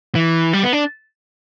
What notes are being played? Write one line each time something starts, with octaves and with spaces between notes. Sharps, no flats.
E3
G3
B3
D4